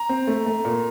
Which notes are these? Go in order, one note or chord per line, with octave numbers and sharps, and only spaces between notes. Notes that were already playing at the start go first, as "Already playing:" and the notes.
Already playing: A#5
C4
A3
A3
A#2